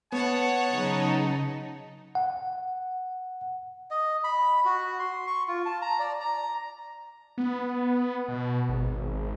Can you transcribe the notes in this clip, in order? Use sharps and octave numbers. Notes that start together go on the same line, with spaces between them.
B3 C#5 F#5 A5
C#3 F#3 D#4
F#5
D#5
B5
F#4
C6
C#6
F4
A5
A#5
D5
A#5
B3
B2
G#1